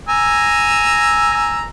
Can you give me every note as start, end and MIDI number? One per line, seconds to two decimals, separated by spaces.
0.09 1.67 80
0.09 1.67 82
0.09 1.67 88